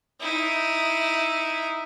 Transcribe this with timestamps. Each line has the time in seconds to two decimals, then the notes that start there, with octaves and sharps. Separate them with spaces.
0.20 D#4 E4